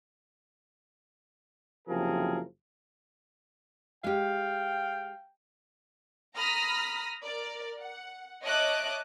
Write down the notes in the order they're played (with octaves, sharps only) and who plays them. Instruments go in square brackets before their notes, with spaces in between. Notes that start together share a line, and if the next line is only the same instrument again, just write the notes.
[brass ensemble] F#1 C3 F3 G#4 A#4
[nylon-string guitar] G#3 G4 [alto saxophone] F5 [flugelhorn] G5
[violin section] A#5 B5 D#6 F6 A#6 B6
A#4 D5
F#5
C#5 D#5 E5 A5 D6 F#6